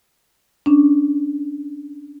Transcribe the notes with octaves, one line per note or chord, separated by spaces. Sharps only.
C#4 D4